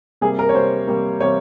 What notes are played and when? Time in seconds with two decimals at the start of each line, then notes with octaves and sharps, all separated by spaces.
0.21 C3 G3 A#3 G#4
0.39 A#4
0.49 C#5
0.54 C3 G3 A#3 C5
0.87 C3 G3 A#3
1.20 C3 G3 A#3 C#5